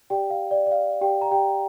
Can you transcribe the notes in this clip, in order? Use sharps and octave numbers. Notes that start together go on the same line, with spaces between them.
G4 D5 G5
F5
D5
D5
F5
G4 G5
A#5
G4 G5